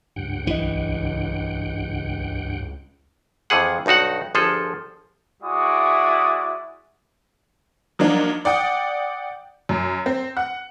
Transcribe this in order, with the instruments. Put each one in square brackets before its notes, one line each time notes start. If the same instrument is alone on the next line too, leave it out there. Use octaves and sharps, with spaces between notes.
[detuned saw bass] C#2 [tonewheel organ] G2 F#5 G5
[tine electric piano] B1 D#5 [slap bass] E3
[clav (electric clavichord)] F2 E3 F3 G#4 F#5
B1 G2 D#4 F#4 F#5
G1 F3 G#4 A4
[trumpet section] G#3 E4 F#4 D5 D#6
[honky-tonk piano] F3 F#3 A#3 D4 D#4
D5 F#5 G5 D#6
F#2
C4
F#5